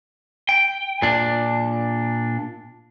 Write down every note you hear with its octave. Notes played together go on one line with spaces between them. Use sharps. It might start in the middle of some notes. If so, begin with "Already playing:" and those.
G5
A#2 D4